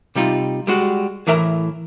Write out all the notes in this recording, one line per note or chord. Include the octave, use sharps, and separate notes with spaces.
C3 G3 D#4 F4
G3 G#3 F#4
A2 E3 A#4 E5 A5 A#5